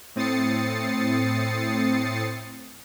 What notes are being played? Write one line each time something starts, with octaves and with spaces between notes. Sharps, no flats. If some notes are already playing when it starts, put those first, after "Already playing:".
A2 C4 D#6 A6 C7 C#7